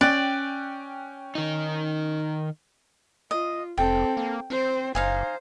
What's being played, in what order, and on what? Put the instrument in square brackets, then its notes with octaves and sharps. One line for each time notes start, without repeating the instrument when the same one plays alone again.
[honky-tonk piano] C#4 G5 F#6 [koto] D5
[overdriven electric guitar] D#3 D#4
[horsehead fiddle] F4 [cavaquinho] D#5
[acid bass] F1 [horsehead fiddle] C4 A4 [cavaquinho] G5
[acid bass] A#3
[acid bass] C4 [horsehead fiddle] C5
[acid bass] F#1 [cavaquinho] D#4 F5 G#5 [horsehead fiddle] C5